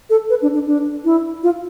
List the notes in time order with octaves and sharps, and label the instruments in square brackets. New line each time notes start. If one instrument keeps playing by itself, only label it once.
[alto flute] A4
B4
D4
D4
D4
E4
F4